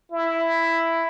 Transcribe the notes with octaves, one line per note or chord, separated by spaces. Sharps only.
E4